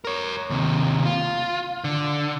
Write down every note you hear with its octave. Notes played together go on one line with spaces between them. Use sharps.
A#4 C#5
D#2 C3
F4
D3